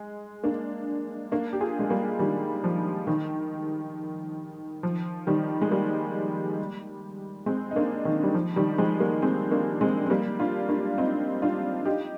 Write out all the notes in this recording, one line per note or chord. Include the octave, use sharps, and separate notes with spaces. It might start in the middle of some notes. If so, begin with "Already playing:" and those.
Already playing: G#3
A#3 D4
A#3 D4
G4
F4 G#4
G#3
G3 A#3
D#3 G3
F3
D#3
F3
D#3 G3
G#3
G3 A#3
G#3 C4
D#4
A#3 D4
D#3
G3
F3
D#3 G3
F3 G#3
G3 A#3
G#3 C4
A#3 D4
G#3 C4
C4
G3 A#3
D4 F4
A#3 D4
C4 D#4
D4 F4
D#4 G4